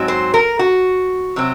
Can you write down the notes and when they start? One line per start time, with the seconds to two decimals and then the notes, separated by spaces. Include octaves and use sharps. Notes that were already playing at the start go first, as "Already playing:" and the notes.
Already playing: G#2 F#3 C4
0.08 C5
0.34 A#4
0.59 F#4
1.36 C3 F#3 C4